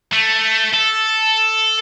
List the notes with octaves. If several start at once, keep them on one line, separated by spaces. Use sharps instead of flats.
A3
A4